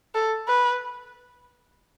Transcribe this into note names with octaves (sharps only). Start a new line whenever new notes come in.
A4
B4